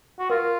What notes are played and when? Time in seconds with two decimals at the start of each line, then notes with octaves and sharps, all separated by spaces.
0.19 F#4
0.30 F4 A#4